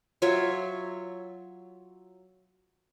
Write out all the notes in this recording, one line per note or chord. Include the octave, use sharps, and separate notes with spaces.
F#3 F4 C#5 E5